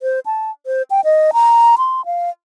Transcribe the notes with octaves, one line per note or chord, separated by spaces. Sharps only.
C5
A5
C5
G5
D#5
A#5
C6
F5